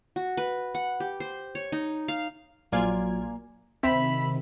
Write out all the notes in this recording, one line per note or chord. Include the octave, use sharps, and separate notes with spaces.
F#4
B4
F#5
G4
C5
C#5
D#4
F5
A#1 F#3 A#3 F4 D5 G#5 G#6
C3 D#3 C4 E5 B5